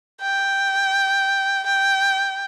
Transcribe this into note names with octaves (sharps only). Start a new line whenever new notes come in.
G5
G5